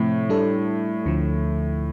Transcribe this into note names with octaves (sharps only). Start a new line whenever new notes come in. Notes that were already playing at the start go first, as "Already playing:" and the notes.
Already playing: A2 C3 F3 A3 C4
G3 D4 A4
D2 D3 F3